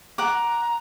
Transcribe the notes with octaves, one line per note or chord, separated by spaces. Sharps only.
F#5 A#5 D6